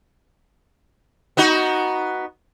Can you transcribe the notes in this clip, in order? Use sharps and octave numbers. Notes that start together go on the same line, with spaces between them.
B3 D#4 F#4